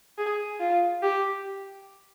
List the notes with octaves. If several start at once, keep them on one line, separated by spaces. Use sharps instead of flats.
G#4
F4
G4